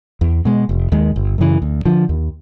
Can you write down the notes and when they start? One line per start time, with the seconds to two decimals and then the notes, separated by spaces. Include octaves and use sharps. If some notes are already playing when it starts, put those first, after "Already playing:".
0.21 E2
0.45 B2 G#3
0.69 F1
0.92 D#2 D#3 G#3
1.16 G1
1.38 F#2 C#3 E3
1.62 D2
1.85 D3 F3
2.09 D#2